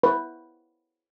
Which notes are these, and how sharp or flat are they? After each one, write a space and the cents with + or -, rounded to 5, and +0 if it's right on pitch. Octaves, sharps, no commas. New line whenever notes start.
B4 +0